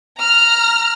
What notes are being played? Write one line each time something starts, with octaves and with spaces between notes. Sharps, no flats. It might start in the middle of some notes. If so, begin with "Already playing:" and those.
A#5 F6